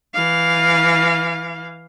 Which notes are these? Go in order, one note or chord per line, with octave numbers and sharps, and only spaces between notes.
E3 F5